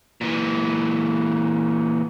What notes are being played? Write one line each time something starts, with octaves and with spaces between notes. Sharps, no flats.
A#2 E3